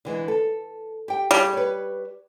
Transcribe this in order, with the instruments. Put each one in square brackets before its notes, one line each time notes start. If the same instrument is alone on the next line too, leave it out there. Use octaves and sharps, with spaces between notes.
[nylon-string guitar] D3 E3 G#3
A4
G4 G5
[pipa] G3 [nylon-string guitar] G#4 C#5 D5
[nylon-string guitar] B4 C#5